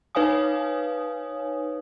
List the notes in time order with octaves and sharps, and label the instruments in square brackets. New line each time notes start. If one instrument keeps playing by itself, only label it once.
[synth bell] D#4 B4 C#5 F5 G#5 D#6